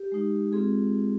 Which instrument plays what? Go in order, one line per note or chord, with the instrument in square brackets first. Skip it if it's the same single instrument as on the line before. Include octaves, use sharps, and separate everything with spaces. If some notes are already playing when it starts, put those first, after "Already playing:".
Already playing: [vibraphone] G4
G#3 D#4
G#3 C4 F4 G#4